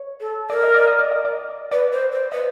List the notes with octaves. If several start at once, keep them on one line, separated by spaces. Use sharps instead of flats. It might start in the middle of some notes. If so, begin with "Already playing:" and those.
Already playing: C#5
A4
A#4 D5
D#5
D5
D#5
D5
D#5
D5
B4 D5
C5
C5
B4 D#5